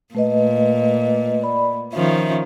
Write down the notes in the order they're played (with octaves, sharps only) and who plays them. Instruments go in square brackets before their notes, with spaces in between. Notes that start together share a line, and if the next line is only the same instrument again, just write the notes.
[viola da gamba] A#2 [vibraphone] A3 B4 D#5
[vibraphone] D5 B5
[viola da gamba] D#3 F3 C#4 [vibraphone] E5